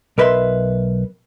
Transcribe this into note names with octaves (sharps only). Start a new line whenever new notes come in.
B1 A#4 B4 D#5 E5 C6